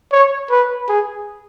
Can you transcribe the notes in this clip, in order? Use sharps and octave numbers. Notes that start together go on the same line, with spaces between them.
C#5
B4
G#4